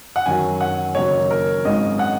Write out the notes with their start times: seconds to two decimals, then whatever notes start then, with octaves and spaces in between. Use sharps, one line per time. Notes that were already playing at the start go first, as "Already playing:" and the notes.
0.16 F#5
0.26 F#2 D#3 F#3 G#5
0.61 F#5
0.95 F#1 F#2 D#3 F#3 A#3 C#5
1.31 A#4
1.65 G#1 G#2 F#3 C#4 D#5
1.99 F#5